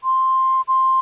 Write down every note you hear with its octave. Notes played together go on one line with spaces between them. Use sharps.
C6
C6